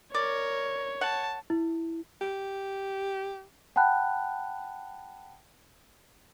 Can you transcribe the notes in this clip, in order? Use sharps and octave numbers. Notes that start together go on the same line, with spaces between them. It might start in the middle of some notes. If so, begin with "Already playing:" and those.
A#4 C#5 D5
F#5 A5
E4
G4
F#5 G5 A5 B5 F#6